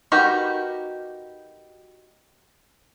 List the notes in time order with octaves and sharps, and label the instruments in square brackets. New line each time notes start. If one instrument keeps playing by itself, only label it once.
[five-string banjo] D#4 F#4 G4 A#4 B4